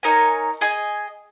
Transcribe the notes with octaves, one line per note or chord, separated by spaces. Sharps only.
D#4 A#4 C#5 G#5
G#4 D#5 G#5